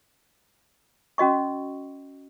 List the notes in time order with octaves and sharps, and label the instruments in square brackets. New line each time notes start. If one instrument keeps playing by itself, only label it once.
[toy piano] C#4 F#4 D#5 C#6